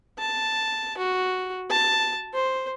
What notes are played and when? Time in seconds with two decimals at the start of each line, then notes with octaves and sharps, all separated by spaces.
0.19 A5
0.98 F#4
1.70 A5
2.34 C5